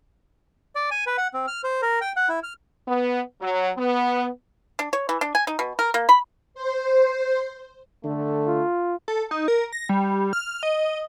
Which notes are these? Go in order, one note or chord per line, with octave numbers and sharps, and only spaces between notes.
D5
G#5
B4
F#5
C4
F6
C5
A#4
G5
F#5
E4
F6
B3
F#3
B3
D4
C#5
E3
D4
G#5
D#4
B2
A#4
A#3
B5
C5
D3 A3
F4
A4
D#4
A#4
A#6
G3
F6
D#5